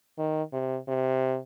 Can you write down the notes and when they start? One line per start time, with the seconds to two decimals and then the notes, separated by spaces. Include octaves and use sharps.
0.18 D#3
0.53 C3
0.88 C3